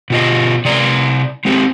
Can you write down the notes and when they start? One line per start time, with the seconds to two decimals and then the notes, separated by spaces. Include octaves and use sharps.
0.10 B2 F4 D#5
0.65 C3 D5 A#5
1.45 G#3 C4 G4